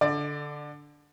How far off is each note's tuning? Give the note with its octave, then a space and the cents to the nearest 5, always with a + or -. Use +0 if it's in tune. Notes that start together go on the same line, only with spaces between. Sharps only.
D3 -5 D5 +25